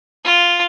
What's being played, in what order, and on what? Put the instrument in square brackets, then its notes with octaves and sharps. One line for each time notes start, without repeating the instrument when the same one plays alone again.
[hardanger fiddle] F4